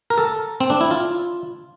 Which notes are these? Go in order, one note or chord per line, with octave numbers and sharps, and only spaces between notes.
A#4
A4
C4
D4
E4
F4